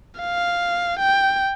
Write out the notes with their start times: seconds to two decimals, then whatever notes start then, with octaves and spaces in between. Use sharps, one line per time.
0.21 F5
0.99 G5